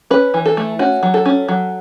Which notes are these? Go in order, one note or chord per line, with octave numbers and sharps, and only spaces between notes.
C#4 B4
E3
A4
A3
C#4 F#4
F#3
A4
C#4
F#3